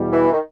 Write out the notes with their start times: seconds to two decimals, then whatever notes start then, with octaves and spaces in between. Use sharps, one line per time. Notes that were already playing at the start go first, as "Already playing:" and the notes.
Already playing: E2 B2 G3
0.12 E3
0.32 D#3